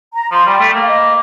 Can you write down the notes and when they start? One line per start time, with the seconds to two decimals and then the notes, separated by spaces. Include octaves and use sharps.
0.13 A#5
0.31 F3 C6
0.45 G3 G5
0.59 A3
0.73 A#3
0.82 F5
0.87 D#5